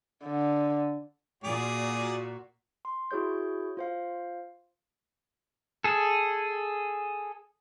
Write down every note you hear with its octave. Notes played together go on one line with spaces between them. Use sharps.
D3
A#2 F#4 G#4 D5
C6
E4 F#4 G#4 C#5 G6
F4 C5 F5
G#4 A4